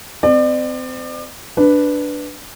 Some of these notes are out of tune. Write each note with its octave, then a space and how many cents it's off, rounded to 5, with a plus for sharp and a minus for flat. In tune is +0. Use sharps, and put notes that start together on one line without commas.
C4 -30 D5 +35
D4 +0 B4 +0